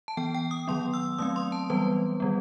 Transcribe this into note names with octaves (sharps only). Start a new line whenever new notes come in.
A5
E3 B3 G5
G5
D#6
D#3 F#3 B3 C6
E6
F#3 A3 C4 D#6
C6
A5
E3 G3 B3 B4
D#3 G3 B3